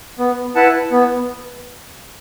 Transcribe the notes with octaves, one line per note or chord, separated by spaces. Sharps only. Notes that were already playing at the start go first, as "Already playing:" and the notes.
B3
E4 B4 F#5 A5
B3